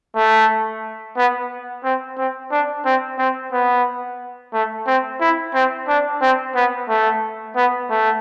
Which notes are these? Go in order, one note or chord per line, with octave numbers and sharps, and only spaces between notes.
A3
B3
C4
C4
D4
C4
C4
B3
A3
C4
E4
C4
D4
C4
B3
A3
B3
A3